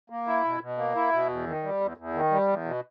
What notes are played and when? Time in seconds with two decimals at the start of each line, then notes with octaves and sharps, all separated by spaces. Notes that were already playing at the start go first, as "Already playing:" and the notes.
0.10 A#3
0.27 E4
0.45 B2
0.61 B2
0.78 A#3
0.95 E4
1.13 B2
1.29 E2
1.46 D#3
1.63 G3
1.81 E2
1.97 E2
2.14 D#3
2.31 G3
2.48 E2
2.65 B2